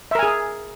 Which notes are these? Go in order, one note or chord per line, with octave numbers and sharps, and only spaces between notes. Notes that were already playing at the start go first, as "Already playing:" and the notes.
G#4 A#4 E5 G#5